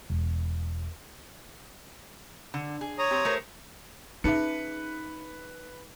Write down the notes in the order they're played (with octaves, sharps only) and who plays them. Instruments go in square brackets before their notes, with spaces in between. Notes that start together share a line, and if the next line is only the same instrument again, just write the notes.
[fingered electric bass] E1
[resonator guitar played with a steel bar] D3
G#4
[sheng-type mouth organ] C#5 A#5 D#6
[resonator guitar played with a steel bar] C4 G4
A3 A#4 C5
[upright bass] C#4 [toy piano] D#4 G#4 E5 [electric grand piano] B4 C#7